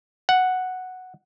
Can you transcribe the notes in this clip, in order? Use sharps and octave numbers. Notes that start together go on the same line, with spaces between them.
F#5